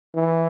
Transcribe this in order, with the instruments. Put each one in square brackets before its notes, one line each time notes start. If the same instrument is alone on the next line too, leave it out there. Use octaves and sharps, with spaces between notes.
[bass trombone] E3